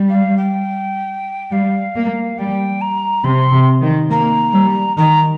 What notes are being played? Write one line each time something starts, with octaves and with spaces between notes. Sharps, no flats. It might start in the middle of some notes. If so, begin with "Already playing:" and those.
Already playing: G3
F5
G5
G3 F5
A#3
G3 G5
A#5
C3 C6
C3
D#3
A#3 A#5
G3
D#3 A#5